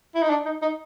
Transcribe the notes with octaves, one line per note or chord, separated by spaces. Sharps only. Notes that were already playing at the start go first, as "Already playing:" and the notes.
E4
D#4
D4
D#4
D#4